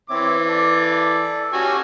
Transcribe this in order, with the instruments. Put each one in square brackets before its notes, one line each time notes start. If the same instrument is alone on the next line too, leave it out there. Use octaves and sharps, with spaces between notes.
[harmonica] E3 D6 [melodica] C4 C#5 E5
[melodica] A4 D5
[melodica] C#4 [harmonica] F#4 G4 G#5